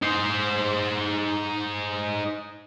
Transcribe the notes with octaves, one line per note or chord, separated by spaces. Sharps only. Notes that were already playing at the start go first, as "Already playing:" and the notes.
D#4 C5